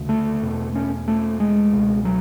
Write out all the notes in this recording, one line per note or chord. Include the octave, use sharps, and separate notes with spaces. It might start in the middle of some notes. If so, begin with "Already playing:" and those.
Already playing: D2 C#3
A3
E2 B2
C#4
A3
G#3
C#2 B2
F#3